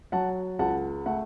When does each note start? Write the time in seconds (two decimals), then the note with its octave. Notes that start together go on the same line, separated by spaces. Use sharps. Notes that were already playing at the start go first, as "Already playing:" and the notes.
0.12 F#3 F#5 A5
0.59 C#2 F#5 A5
1.06 A3 F#5